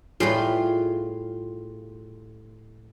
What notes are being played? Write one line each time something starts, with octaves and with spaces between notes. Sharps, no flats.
A2 G3 F4 G#4 B4